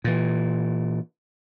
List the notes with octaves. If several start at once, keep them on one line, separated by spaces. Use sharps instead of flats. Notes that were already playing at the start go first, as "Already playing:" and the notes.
A#2 E3